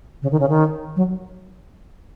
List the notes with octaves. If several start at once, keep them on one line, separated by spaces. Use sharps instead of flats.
C#3
D#3
C#3
D#3
F#3